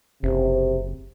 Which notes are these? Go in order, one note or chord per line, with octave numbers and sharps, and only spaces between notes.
F#1 C3